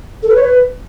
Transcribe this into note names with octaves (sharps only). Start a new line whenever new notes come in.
A4
B4
C#5
B4